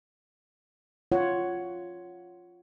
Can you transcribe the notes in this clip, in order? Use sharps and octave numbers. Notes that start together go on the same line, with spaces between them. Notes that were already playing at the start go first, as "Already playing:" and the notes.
F4 C#5 F#5